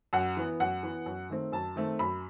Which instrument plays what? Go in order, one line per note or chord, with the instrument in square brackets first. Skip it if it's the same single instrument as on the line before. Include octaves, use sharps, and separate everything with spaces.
[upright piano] F#2 F#5
E3 B3
F#2 F#5
E3 B3
F#2
D#3 A3 C4
F#2 A5
D#3 A3 C4
F#2 B5